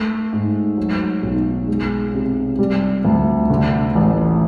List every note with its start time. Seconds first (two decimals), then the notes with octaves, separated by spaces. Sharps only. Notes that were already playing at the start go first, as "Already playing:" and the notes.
Already playing: A3
0.33 G#2
0.77 F#3
1.22 B1
1.68 G#3
2.14 C3
2.59 G3
3.05 D2
3.50 D3
3.95 A1